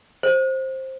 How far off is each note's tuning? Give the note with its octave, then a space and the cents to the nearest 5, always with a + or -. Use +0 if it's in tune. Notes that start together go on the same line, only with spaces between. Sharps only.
C5 +15